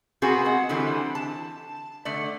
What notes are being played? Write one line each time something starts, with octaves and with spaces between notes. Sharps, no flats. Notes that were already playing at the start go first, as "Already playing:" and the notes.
B3 C4 F#4 G#4 A#4 F5
G#3 F#5
D3 E3 G3 C4
A5
D3 A3 D5